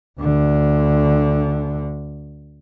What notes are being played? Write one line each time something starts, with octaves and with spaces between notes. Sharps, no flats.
D2 D3